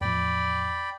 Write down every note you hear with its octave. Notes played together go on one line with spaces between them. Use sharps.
E2 A2 F3 D5 G5 B5